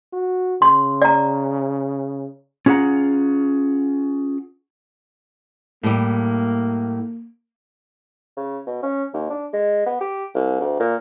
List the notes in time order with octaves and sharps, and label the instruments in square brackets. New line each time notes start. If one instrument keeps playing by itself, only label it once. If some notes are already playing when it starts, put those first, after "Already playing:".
[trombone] F#4
[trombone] C#3 [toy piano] C6
[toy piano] D5 A#5
[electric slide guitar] C#4 F4 G#4 C5 F#5 A#5
[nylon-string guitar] A2 G3 [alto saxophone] A#3
[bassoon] C#3
B2
C#4
D#2
D4
G#3
B3
G4
C2
D2
A#2